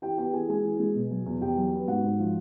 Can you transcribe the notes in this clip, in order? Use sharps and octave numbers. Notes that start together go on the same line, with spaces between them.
E3 G4 G5
B3 G4 G5
E3 G#4 G#5
G#3 G#4 G#5
E3
G#3
B2
F#3
E2
E2 G4 G5
F#3
B3
G#2 F#4 F#5
G#2
F3